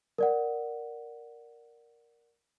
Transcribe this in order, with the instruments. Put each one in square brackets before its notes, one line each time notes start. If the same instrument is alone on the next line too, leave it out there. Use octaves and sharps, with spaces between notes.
[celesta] A#4 D5 F#5